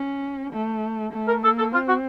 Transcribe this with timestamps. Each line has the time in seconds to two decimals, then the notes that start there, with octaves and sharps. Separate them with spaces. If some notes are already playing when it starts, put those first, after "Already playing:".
Already playing: C#4
0.53 A3
1.13 A3
1.28 A#4
1.43 A#3 A4
1.58 A4
1.73 C4 F4
1.88 F#4